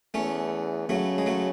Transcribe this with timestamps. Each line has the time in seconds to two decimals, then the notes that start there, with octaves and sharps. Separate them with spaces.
0.14 E2 A3 C#4
0.89 C#3 F#3 A3
1.18 G#3
1.26 F#3 A3